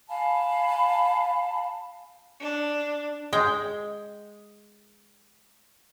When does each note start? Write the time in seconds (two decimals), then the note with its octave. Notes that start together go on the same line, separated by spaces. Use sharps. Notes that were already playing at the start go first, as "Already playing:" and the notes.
0.09 F5 G#5 A5 B5
2.41 D4
3.33 G#3 G5